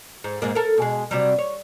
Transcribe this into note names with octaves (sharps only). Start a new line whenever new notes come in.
G#2
G#2 G#3 A#3
A4 A#4
B2 G#3
C3 F#3 G3
C#5